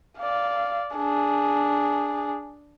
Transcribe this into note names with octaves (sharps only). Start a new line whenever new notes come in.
D5 F5
D4 G#4